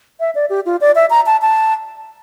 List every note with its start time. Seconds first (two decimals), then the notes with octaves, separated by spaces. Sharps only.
0.20 E5
0.35 D5
0.50 G4
0.66 F4
0.81 D5
0.95 E5
1.10 A#5
1.26 A5
1.42 A5